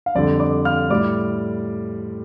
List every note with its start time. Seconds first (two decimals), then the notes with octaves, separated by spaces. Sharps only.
0.06 F5
0.15 F2 D3 G3 D5
0.40 D5 D6
0.65 F5 F6
0.90 A2 G3 D5 D6